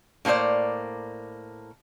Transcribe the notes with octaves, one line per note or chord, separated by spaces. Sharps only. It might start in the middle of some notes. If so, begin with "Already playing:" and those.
A2 A#3 C#4 C5 D5